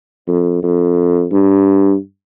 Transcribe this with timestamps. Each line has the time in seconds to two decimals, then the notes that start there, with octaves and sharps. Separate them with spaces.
0.28 F2
0.63 F2
1.32 G2